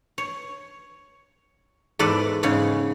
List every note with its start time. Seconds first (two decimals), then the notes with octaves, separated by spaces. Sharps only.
0.18 C#5
1.99 E2 G#2 A4 B4 D5
2.43 G#2 C#3 G#4 C#5